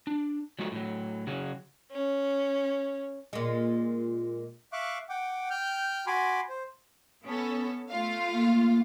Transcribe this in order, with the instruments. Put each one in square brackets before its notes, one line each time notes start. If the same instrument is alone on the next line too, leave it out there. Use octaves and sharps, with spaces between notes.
[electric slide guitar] D4
F#3 G#3 A3 F#4
A2 F#3
C#3 F#3 G#4
[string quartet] C#4
[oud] A#2 G#3
[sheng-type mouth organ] E5 F5 C#6 D6 F#6
F#5 G5 D6
G5 F6 G6
F#4 G#5 B5 C6 D6
C5
[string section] B3 C#4 A4
A3 F4 F5
[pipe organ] A#3